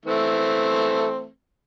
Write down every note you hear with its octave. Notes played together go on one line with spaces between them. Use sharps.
E3 A3 C4